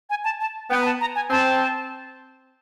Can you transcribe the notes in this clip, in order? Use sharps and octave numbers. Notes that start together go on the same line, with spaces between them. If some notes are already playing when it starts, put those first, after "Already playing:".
G#5
A5
A5
B3 G5
A#5
A5
A#5
G#5
C4 A5